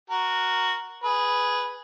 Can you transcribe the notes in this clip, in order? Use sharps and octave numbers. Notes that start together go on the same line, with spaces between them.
F#4 A#4
G#4 B4